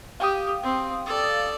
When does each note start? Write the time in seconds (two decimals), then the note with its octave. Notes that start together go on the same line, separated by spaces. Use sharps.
0.20 G4 F5 G5 D#6
0.63 C4
1.06 A4 D5